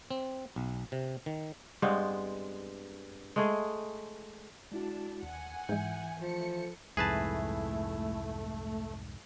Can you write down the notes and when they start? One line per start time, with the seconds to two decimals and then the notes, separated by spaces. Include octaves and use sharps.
0.11 C4
0.56 B1
0.92 C3
1.26 D#3
1.82 G2 G#3 B3 C4
3.36 G#3 A3 G#4
4.72 G#3 D4 E4 F#4
5.23 D#2 F#5 G#5
5.69 G#2 E3 G#3 E5 G6
6.21 F3 A3 C#7
6.97 C2 F2 G#2 A3 E4 G#4 B4 A5